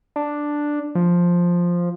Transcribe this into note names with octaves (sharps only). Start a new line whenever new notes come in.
D4
F3